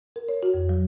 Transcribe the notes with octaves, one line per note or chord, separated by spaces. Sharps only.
A#4
C#5
F#4
F2
F#3